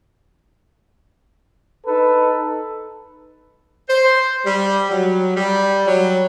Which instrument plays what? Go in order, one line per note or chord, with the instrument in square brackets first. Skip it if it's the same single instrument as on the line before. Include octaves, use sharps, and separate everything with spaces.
[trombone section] D#4 A4 B4
[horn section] C5
G3
F#3
G3
F#3